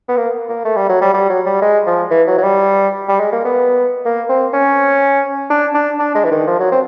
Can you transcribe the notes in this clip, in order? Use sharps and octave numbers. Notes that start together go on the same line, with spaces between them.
B3
A#3
A#3
A3
G3
F#3
G3
G3
F#3
G3
G#3
F3
E3
F#3
F#3
G3
G3
G#3
A#3
B3
A#3
C4
C#4
D4
D4
D4
G#3
E3
D#3
F3
F#3
C4